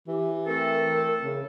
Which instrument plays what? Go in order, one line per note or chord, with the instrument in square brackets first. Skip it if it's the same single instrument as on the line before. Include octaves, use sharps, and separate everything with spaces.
[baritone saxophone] E3 [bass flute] G4
[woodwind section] A3 C4 A4 [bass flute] A#4
[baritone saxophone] C#3